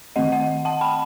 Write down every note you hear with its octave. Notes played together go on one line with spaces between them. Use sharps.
D#3 A3 C4 D#5 F#5
D#5 F#5
F#5 A5
G5 B5